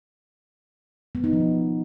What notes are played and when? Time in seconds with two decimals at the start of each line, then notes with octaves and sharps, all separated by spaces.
1.15 B3
1.24 D#4
1.33 F3